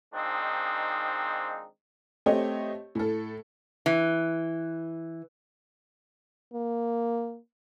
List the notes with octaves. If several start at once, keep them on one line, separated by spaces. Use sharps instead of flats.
D#3 F3 G#3 C4 D4 D#4
A3 C4 G4 C#5 D#5
A2 A4
E3
A#3